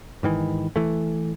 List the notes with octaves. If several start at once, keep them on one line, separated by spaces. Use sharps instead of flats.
G#2 D#3 E3
E3 A3